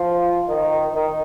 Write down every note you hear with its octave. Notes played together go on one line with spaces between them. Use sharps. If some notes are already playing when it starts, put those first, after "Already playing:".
Already playing: F3 F4
D#3 D#4
D#3 D#4